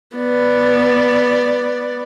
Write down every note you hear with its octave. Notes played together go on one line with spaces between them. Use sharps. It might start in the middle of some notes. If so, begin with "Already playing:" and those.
B3 D5